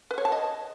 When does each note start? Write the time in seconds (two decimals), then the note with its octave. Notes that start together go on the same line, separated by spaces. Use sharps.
0.11 B4
0.18 C#5
0.25 A5
0.32 D#5